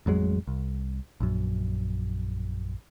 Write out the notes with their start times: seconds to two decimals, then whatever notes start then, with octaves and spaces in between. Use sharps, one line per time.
0.06 A1 F2 F#3 G#3
0.48 C2
1.20 A#1 F#2